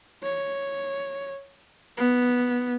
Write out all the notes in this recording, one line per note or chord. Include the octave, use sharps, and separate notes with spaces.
C#5
B3